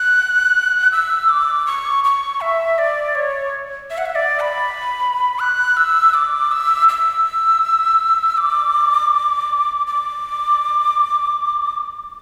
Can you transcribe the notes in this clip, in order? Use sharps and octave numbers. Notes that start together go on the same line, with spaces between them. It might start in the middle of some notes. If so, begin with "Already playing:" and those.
Already playing: F#6
E6
D6
C#6
C#6
E5
D5
C#5
E5
F#5
E5
D5
B5
F#6
E6
D6
E6
E6
D6
D6